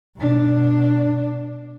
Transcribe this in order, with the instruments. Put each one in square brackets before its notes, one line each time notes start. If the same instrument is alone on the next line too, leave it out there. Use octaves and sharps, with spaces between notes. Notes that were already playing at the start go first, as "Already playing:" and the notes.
[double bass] B2 D4